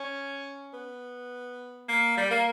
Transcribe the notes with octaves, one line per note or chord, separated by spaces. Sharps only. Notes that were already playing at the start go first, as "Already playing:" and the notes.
Already playing: C#4
B3
A#3
G3
A#3